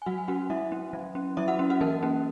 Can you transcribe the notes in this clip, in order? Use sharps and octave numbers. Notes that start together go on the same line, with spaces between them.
G#5
F#3 F#4 F#5
G#5
C#4 F#4 F#5
F#3 E4 E5
C#4
F#3
C#4
F#3 E4 E5
F#4 F#5
C#4
F#4 F#5
E3 A#3 A#4
A#3 C#4